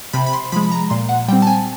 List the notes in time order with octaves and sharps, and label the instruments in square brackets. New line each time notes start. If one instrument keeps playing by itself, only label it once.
[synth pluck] C3 B5
B5
C6
F3 G#3 B5
B5
A#5
A#2 C6
F#5
G3 C4 G5
A5
G#5